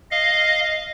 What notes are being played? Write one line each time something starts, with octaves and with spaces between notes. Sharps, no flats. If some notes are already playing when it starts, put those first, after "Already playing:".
D#5 F5